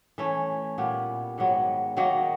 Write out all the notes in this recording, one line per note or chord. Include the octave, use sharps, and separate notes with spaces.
E3 A3 C#4
A#2 G3 B3
G#2 D#3 F#3 B3
D#3 F#3 A#3 D#4